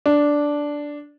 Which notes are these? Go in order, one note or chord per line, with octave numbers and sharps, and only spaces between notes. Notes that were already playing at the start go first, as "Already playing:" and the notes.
D4